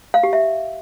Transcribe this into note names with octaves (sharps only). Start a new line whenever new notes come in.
F5
G4
E5